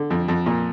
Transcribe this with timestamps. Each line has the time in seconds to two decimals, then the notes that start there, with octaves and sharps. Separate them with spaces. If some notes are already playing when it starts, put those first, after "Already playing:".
Already playing: D3
0.10 F2
0.28 F2
0.46 A#2